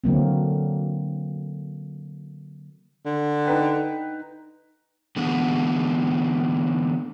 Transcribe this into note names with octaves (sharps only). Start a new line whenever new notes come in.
D3 F#3 A#3 C4
D3
D#4 B4 G5
D3 E3 G#3 B3